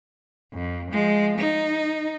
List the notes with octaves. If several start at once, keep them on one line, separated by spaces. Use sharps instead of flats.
F2
F3 G#3
D#4